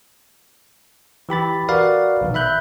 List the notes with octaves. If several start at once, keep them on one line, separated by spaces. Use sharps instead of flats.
E3 G4 B5 A6
F#4 A#4 B4 D5 F5
A#1 B2 D#3
E5 B5 F#6 G6